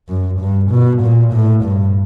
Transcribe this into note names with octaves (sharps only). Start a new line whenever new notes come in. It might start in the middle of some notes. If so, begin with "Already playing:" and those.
F#2
G2
B2
A#2
A2
G2